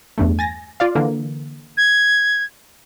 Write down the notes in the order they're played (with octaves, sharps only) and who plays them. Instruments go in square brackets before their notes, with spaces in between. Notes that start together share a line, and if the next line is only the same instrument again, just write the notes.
[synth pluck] E2 G2 A3
G#5 A6 A#6
F4 D5 F5
D3 E3 A#3
[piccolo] G#6